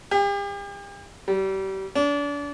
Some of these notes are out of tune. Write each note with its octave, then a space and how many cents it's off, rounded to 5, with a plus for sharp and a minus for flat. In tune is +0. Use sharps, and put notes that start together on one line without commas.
G4 +40
G3 -30
D4 -35